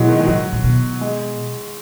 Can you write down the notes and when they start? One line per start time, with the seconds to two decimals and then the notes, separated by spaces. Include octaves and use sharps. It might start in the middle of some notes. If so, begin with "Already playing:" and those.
Already playing: B2 E3 F#3 G#3
0.08 D#3
0.20 G#3
0.27 A2 F#3
0.52 A2
0.64 B2
1.01 G#3